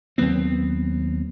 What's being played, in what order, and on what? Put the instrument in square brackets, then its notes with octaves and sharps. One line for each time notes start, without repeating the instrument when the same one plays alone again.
[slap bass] D#2 F#3 B3 C4